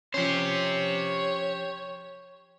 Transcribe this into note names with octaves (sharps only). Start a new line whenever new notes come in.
F3 C#4 G4 C5 C#5